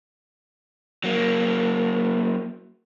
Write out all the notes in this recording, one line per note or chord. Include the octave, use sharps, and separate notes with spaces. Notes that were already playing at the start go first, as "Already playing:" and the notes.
F#3 A#3